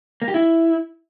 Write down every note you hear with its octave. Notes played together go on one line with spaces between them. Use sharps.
A#3
G4
E4